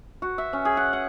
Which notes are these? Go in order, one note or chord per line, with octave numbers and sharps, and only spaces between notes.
F#4
E5
C#4
G#4
F#5
F#5